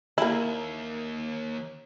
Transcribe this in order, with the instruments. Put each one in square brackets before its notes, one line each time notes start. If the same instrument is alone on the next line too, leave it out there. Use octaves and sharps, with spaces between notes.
[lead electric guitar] D#2 [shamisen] A#3 E4